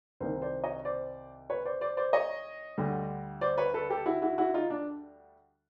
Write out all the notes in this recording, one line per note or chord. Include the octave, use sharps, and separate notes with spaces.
C2 C3 D#3 A#4 C5
C5 D5
C#5 D#5
C5 D5
B4 C#5
C5 D5
C5 D5
C5 D5
C#5 D#5
D2 D3 G3
C5 D5
B4 C#5
A4 B4
G4 A4
E4 F#4
E4 F#4
E4 F#4
D#4 F4
D4